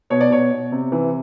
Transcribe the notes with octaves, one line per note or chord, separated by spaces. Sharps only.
B2 C#5
D5
B2 C#5
B2
C3
E3